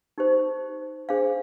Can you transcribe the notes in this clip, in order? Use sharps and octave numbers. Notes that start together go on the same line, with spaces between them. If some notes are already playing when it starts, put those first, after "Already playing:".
D#4 G4 C5
D4 G#4 C5 F5